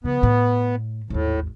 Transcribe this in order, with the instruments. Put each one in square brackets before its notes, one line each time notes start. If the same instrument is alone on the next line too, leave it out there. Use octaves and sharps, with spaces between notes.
[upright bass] C#3 F3 [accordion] B3
[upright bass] A2
[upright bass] G#1 D#2 [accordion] A2